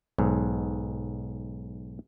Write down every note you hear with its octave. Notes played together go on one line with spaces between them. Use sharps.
B1 G#2